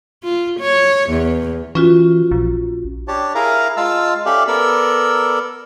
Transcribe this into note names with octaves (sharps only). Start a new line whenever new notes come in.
F4
C#5
E2
E3 C#4 F4 F#4
A#1
D4 G4 C#5 A5
E4 G#4 A#4 F5 A#5
G#3 F4 F5 A5 E6
C#4 G4 A4 D5 E5 F5
B3 A4 A#4 D5 E6